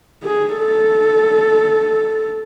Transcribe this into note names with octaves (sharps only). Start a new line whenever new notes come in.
G#4
A4